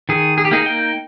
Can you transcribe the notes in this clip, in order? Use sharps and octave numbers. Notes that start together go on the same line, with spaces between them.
D#3 G#4
G#4
G4
A#3 D#4 G#4
G5